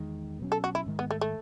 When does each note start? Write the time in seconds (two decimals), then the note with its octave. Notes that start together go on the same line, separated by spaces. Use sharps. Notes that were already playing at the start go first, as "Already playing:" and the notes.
Already playing: E2 D#3 G#3
0.39 B2 F#3 C#4
0.52 A4
0.64 F#4
0.75 E4
0.86 G#2 D#3 G#3
0.99 B3
1.11 A3
1.21 A3